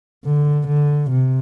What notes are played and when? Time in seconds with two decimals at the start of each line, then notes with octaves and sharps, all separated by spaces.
0.25 D3
0.68 D3
1.10 C3